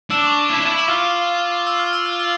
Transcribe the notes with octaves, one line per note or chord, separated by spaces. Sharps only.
D4 E6
D6
C#6
D6
E4
D4
E4
E6
F4 F6
E6
F6
E6
F6
E6